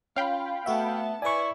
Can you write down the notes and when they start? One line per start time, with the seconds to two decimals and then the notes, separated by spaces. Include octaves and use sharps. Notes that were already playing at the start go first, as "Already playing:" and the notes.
0.16 C#4 F4 F5 G5 B5
0.66 A3 B3 F#4 E5 A5
1.22 E4 B4 D5 G#5 C#6